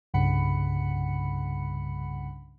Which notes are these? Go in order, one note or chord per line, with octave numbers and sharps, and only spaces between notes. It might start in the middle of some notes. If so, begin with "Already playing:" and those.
C2 G2 C#3 F#5 B5 C#7